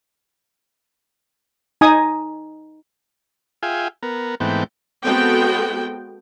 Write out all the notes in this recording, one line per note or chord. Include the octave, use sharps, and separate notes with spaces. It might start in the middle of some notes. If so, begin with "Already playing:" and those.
D#4 G#5 D#6
F4 G#4 E5 F5 G5 G#5
B3 A#4
G#2 E3 A3 B3 C4 G5
G#3 B3 C4 F#4 A4 G5